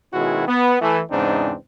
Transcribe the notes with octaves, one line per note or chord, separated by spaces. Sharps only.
B2 D#3 G#3 C#4 E4 F#4
B3
E3 A3
E2 G#2 C#3 C4 D4 D#4